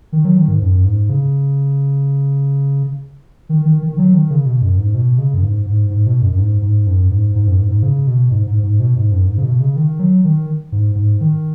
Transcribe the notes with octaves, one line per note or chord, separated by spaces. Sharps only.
D#3
F#3
D#3
G#2
F#2
G#2
C#3
D#3
D#3
D#3
D#3
F#3
D#3
C#3
B2
F#2
G#2
B2
C#3
F#2
G#2
G#2
G#2
B2
F#2
F#2
G#2
G#2
F#2
G#2
G#2
F#2
G#2
G#2
C#3
B2
G#2
G#2
G#2
B2
G#2
F#2
G#2
C#3
B2
C#3
D#3
F#3
D#3
G#2
G#2
D#3